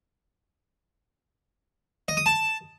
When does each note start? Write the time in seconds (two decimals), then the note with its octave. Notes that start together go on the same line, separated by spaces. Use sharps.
2.08 D#5
2.17 D#6
2.26 A5